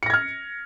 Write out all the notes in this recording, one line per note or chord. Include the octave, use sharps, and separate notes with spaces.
F6 G#6 A#6 C#7